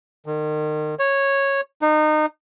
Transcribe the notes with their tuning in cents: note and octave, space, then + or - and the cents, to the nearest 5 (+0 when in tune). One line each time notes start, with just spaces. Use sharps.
D#3 -35
C#5 -10
D#4 -25